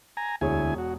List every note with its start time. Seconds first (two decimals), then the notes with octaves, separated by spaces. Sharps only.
0.17 G#5 A#5
0.41 E1 D2 E4 G#4 C#5 G#5
0.78 F#4